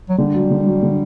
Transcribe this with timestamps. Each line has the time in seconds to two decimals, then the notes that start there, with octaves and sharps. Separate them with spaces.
0.09 F#3
0.18 D3 G3
0.34 F#3
0.50 D3
0.66 F#3
0.82 D3